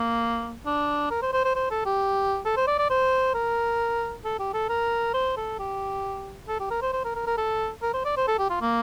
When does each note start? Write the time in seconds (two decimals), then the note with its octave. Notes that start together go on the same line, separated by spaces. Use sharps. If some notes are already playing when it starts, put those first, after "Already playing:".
Already playing: A#3
0.66 D4
1.11 A#4
1.22 C5
1.33 C5
1.44 C5
1.55 C5
1.71 A4
1.86 G4
2.45 A4
2.56 C5
2.67 D5
2.79 D5
2.90 C5
3.34 A#4
4.25 A4
4.39 G4
4.54 A4
4.69 A#4
5.14 C5
5.37 A4
5.59 G4
6.48 A4
6.60 G4
6.71 A#4
6.82 C5
6.93 C5
7.05 A#4
7.15 A#4
7.27 A#4
7.38 A4
7.82 A#4
7.94 C5
8.05 D5
8.17 C5
8.28 A4
8.39 G4
8.50 F4
8.61 A#3